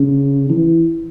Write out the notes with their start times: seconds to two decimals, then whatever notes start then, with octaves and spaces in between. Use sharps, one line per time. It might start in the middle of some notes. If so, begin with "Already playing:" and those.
Already playing: C#3
0.50 E3